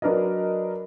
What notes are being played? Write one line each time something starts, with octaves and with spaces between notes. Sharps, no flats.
F#3 D4 A#4 B4 D#5